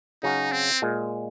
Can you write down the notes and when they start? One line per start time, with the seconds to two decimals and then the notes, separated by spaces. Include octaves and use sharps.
0.23 C#3 F#3 C#4 D#4 F#4
0.52 C4
0.82 A#2 G#3